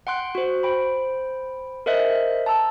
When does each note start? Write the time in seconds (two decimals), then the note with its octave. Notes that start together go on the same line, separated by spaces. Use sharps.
0.07 F#5 G5 C6 F#6
0.35 F#4 C5
0.63 C5 G5 B5
1.86 A#4 C5 D#5 E5 F#6
2.46 A5 A#5 E6